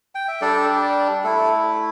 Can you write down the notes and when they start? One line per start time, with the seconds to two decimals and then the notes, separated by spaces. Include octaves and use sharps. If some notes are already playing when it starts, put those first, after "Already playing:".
0.15 G5
0.28 E5
0.41 G3 D4 A4 D5
1.24 A3 E4 A4